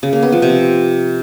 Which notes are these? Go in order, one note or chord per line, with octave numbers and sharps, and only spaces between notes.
C#3
A#3
B3
F3
C3